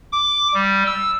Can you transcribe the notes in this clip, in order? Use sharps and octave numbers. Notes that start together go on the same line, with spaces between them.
D6
G3
E6